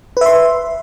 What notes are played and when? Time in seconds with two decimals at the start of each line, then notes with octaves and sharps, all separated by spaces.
0.17 B4
0.21 E5
0.26 C6